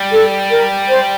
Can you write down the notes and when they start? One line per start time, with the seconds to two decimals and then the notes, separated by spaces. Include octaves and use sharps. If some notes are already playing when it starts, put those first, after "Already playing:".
Already playing: G3
0.12 A4
0.51 A#4
0.89 C5